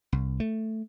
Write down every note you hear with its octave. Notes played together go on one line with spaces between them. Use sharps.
C2
A3